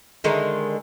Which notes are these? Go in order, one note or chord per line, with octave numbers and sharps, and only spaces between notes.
D3 D#3 G#3